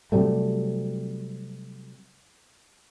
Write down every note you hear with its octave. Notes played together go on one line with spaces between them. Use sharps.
C3 F#3 G3 A3